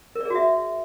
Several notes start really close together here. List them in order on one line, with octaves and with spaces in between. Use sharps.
A#4 D5 G#4 F#4 E5